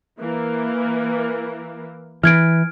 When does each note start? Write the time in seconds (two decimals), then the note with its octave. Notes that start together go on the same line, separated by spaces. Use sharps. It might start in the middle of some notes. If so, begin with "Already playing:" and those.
0.18 E3 A#3
2.23 E3 F6 G#6 D7